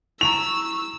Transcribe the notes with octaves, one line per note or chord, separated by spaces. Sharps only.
E4 A#5 C#6 E6 F7